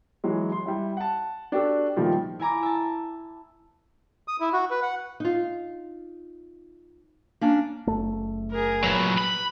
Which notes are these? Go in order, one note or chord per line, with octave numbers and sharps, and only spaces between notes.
E3 F#3 G#3
C6
G3 E4
F#5 A5
D4 F#4 G4 A4
A#2 D#3 F3 G3 A3 F4
E4 G#5 A#5 D6
E5 A5
D#6
E4
F#4
B4
F#5
D#4 F4
A#3 C#4 D4
F#1 A3
G#4 A#4
A#2 F#3 B4
B5